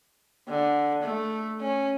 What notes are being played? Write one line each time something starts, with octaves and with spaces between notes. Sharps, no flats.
D3
A3
C#4